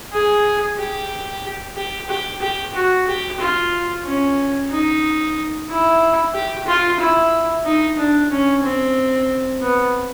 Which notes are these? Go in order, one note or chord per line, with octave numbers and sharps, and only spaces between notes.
G#4
G4
G4
G4
G4
F#4
G4
F4
C#4
D#4
E4
G4
F4
E4
D#4
D4
C#4
C4
B3